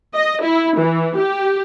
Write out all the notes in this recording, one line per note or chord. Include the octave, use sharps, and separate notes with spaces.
D#5
E4
E3
G4